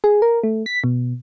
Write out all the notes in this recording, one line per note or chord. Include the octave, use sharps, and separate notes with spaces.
G#4
A#4
A3
B6
B2